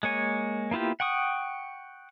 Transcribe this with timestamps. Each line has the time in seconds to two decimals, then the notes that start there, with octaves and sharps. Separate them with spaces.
0.03 G#3 A#3 C#5 G#5
0.71 A#3 B3 E4 F4 G4
1.00 F#5 G5 C#6 D#6